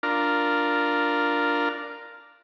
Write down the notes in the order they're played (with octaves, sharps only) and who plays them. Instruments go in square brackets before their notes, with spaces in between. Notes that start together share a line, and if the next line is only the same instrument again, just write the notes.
[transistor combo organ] D4 F4 A#4